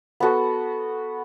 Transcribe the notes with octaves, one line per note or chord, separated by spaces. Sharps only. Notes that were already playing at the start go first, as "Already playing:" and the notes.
B3 F#4 A4